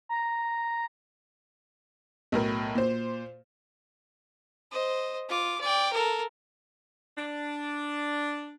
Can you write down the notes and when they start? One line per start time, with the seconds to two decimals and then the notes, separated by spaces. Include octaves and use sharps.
0.09 A#5
2.32 B1 A2 A#4
2.75 A#2 C5
4.72 C5 D#5
5.29 F4 D6
5.60 D5 G5
5.93 A4 A#4
7.18 D4